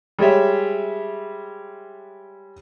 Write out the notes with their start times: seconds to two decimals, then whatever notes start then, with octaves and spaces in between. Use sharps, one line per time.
0.19 G3 G#3 C#5 E5